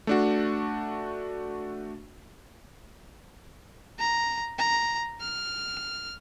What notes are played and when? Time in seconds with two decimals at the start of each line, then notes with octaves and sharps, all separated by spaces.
0.07 A3 D4 F#4
3.99 A#5
4.58 A#5
5.21 F6